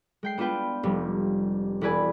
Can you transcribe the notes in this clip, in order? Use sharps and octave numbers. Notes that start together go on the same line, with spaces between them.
G#3 G5 C7
B3 D4 F4 B4 G5
F1 G3
E1 E4 G#4 B4 D5 G#5